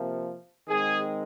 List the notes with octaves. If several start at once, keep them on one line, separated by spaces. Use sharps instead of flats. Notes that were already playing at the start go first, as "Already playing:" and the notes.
Already playing: C3 F3 A#3
D#3 G#3 C4 G#4